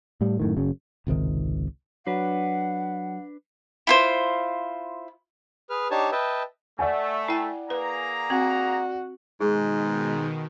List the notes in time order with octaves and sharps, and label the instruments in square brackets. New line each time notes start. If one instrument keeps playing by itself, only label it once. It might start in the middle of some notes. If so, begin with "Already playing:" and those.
[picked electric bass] A2 G3
F#2 A2 D#3
F#1 F#2 C#3
[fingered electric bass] G#1 C#2 C3 D#3
[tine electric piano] F#3 [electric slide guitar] D4 B4 [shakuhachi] F#5
[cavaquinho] E4 F4 C5
[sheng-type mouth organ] G#4 B4 F6
D4 D#4 G4 C#5 A5
B4 D#5 E5 G5 A5
[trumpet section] A3 [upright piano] D5 F#5 G#5
[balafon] E4 G5
[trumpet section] A#3 G#4 A#5 [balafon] B4
[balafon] C4 [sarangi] F#4
[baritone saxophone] G#2 [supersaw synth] B2 D#3 [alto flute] G#3 [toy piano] G#4